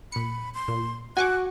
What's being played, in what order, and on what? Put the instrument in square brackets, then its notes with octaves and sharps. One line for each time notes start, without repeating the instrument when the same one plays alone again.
[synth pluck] A#2 C#7 [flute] B5
[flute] C6
[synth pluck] A#2
[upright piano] F#4 [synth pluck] G#5 C#6 D6 [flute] F#6